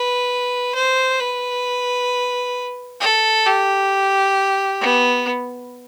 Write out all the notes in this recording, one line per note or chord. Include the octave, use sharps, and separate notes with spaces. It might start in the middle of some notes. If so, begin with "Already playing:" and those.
Already playing: B4
C5
B4
A4
G4
B3